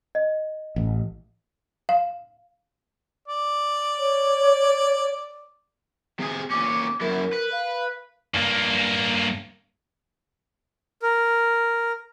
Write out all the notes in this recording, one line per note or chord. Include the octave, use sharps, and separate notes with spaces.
D#5
A1
F5
D5
C#5
C3 G#4
A#2 C#4 D6
F#2 E4 A#4
B4
F5
G2 A#3
A#4